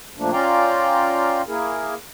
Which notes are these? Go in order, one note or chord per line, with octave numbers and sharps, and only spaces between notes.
A#2 F3 A3 A#3 D4
C#4 F4 D5 F5 G5 A#5
A#3 E4 G#4 A#4